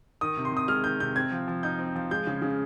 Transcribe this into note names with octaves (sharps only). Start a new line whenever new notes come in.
D#3 D#6
C3
C6
C3 D#6
G#3 F6
D#3 G6
C3 G6
C4 G#6
F3
F3
D#4 G6
C4
F3
G#3 G6
C#3
C#3